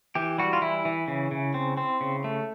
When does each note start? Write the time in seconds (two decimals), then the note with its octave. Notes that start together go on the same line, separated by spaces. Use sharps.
0.15 E3 G4
0.39 G3 F#4
0.53 F4
0.62 E3 E4
0.85 E3
1.08 C#3
1.31 C#3
1.54 C4
1.77 C4
2.01 C#3
2.24 A3